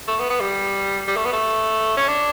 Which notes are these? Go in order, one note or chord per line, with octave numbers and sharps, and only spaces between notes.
A3
B3
B3
G3
G3
A3
B3
A3
C#4
D4